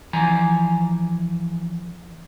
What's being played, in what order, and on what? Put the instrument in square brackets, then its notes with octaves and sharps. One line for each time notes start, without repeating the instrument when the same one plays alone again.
[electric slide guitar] E3 F3 G#5 A#5